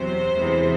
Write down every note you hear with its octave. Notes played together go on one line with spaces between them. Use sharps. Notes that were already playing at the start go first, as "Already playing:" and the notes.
Already playing: E2 C3 F#3 C5
E2 C3 E3 G#3